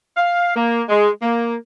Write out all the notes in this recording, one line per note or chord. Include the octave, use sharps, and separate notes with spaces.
F5
A#3
G#3
A#3